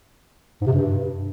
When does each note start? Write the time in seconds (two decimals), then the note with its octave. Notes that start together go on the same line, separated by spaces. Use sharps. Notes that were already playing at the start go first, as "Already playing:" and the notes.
0.62 G#2
0.67 C3
0.72 G2